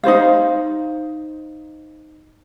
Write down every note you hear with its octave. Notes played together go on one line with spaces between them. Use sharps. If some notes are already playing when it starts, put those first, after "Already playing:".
D#4 F4 C5 F5